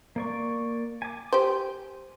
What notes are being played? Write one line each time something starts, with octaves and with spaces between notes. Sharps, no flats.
A#3 D5 C#6
G#5 D6
G4 C5